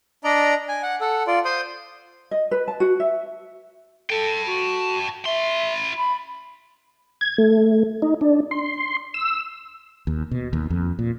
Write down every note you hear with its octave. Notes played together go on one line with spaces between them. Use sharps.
D4 D5 D#5 A#5
G#5
F#5
A4 F#5
F4 D5
C5 C6 D#6
D#5
B4
A5
F#4
E5
A4 G5 A5
F#4
E4 E5 C6
B5
G#6
A3
D#4
D4
C6
E6
D#2
B2
D#2
F2
A#2